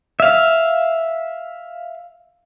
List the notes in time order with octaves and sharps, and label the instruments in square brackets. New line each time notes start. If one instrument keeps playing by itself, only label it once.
[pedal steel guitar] E5 F5